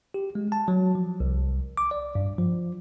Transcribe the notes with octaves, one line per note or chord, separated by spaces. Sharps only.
G4
G#3
A5
F#3
F3
C2
D6
D5
G2
F3